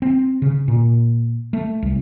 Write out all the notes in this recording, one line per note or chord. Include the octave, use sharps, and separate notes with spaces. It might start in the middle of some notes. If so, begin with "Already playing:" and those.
C4
C#3
A#2
A3
C2